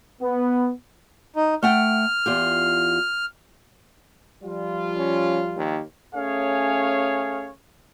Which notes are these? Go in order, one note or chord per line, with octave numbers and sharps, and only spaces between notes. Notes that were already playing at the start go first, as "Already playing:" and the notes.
B3
D#4
A3 F#5 G5 F6
E2 F4 G4
F3 G3 F4
C#4
D#2
A3 C#4 G#4 C#5 F5